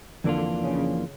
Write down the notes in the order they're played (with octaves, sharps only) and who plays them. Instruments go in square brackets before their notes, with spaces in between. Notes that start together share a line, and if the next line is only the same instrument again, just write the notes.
[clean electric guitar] F2 E3 A#3 D4 F4 [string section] D3
[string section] C#3